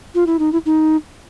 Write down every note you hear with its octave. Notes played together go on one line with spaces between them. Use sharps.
F4
E4
D#4
E4
D#4